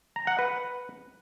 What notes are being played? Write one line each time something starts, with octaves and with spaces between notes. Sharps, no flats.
A#5
F#5
B4